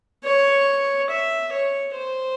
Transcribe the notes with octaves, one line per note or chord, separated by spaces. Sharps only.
C#5
E5
C#5
C5